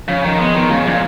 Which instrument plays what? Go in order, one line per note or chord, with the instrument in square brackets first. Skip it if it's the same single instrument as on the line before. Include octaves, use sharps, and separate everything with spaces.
[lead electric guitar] C#3 [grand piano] F3
[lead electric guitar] D#3 [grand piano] F3
[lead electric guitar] G#3 [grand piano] B3
[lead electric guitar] D#3 [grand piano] B3
[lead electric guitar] C#3 [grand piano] G#3
[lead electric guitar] A#2 [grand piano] F3